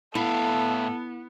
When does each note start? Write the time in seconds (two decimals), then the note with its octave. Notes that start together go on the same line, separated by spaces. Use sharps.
0.15 A2 B3 E4 A4 E5 F5